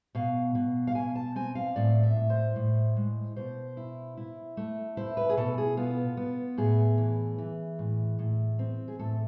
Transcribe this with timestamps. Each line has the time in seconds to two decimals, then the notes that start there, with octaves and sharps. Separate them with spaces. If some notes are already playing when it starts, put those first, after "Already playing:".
0.15 B2 F5
0.55 B2
0.87 F5
0.95 B2 G#5
1.15 A5
1.36 C4 G#5
1.55 F5
1.76 A2 D5
2.03 E5
2.16 A2
2.30 C5
2.56 A2
2.97 G#3
3.36 B2 C5
3.77 E4
4.17 E4
4.57 A3
4.97 E4 C5
5.17 B4
5.29 G#4
5.37 B2 A4
5.58 G#4
5.77 B3 F4
6.17 B3
6.57 A2 G#4
6.98 E3
7.38 E3
7.79 A2
8.19 A2
8.59 C4
8.88 G#4
8.99 A2 A4